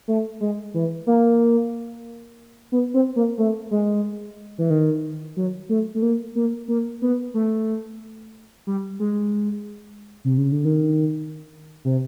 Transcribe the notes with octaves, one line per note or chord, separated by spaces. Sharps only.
A3
G#3
E3
A#3
B3
C4
A#3
A3
G#3
E3
D#3
F#3
A3
A3
A#3
A#3
A#3
B3
A3
G3
G#3
C3
C#3
D3
D#3
C3